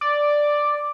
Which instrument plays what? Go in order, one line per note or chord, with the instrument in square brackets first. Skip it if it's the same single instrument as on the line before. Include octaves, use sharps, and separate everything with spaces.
[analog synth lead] D5